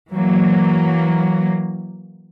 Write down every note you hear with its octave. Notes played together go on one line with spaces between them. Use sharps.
E3 F#3 A#3